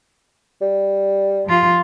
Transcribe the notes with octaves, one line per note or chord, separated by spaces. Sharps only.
G3
F3 F4